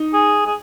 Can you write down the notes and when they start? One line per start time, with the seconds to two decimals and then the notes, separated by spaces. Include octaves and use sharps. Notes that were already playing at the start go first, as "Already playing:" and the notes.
Already playing: D#4
0.13 G#4
0.46 G#4